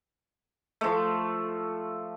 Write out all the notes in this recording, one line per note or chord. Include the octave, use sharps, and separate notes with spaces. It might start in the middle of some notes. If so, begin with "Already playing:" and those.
F3 A3